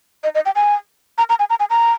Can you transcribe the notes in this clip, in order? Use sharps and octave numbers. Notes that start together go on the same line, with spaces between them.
D#5
D#5
G5
G#5
A#5
A#5
G#5
A#5
G#5
A#5